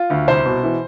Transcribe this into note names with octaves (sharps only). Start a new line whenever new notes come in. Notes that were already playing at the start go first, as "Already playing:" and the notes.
Already playing: F4
D2
C2 C5
B2
E3